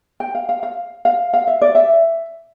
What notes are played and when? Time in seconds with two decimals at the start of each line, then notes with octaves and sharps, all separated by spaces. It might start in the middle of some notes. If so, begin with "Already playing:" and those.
0.20 G5
0.35 F5
0.49 F5
0.63 F5
1.05 F5
1.33 F5
1.47 E5
1.62 D5
1.75 E5